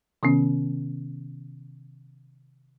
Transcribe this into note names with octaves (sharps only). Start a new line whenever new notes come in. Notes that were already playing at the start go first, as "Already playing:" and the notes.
C3 D#3 B3 C#4